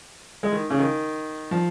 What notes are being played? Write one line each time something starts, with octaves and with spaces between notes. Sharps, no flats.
G#3
D#3
C#3
D#3
F3